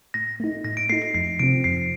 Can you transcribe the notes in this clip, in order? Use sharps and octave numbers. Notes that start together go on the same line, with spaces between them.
A2 A#6
A3 D#4
A2 A#6
D7
A3 D#4 C7
C7
F2 C7
C3 F3 C4 D7
F2 C7